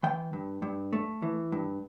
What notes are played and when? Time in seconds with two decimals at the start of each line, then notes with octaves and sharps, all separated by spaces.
0.03 E3 G5
0.33 G2
0.62 G2
0.93 A3
1.22 E3
1.52 G2